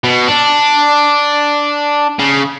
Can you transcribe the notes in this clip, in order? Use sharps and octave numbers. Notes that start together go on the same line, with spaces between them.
B2
D4
C#3